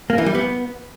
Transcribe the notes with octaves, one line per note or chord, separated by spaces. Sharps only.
A#3
E3
G3
B3